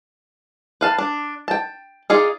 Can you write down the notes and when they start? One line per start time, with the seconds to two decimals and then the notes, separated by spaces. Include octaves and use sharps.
0.81 B4 F5 A5
0.98 D4
1.48 G5 A5
2.10 D#4 F4 G#4 D5 F5